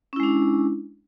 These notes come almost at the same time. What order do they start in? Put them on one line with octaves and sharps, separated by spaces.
C#4 E4 G#3 D4